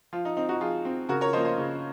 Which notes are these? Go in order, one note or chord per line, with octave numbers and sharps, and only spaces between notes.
F3 F4
D#4
C4 D#4
D#4 F#4
F3 F4 G#4
C4
C#3 F#4 A#4
A#4 C#5
F3 A#3 C5 D#5
C5 D#5
C#3